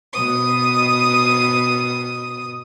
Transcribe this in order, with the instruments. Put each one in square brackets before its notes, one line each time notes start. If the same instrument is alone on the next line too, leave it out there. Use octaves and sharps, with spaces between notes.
[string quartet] B2 D#6